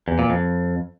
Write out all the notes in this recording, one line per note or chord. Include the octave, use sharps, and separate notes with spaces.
E2
A#2
F2